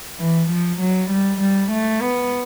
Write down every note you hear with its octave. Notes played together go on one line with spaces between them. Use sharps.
E3
F3
F#3
G3
G3
A3
B3